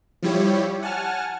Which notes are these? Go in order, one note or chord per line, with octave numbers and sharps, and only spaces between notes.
F3 G3 E4 G4 C#5
F#5 G#5 A5 F6